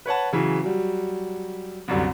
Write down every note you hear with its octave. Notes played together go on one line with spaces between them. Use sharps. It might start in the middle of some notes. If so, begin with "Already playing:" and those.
B4 C#5 F#5 A5
C#3 E3 F#3
F#3 G3
C2 F#2 D3 G3